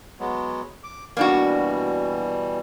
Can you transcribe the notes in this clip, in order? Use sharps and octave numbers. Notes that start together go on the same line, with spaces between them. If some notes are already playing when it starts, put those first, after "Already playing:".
F#3 G#3 B3
D6
B2 E3 G3 A#3 D4 F#4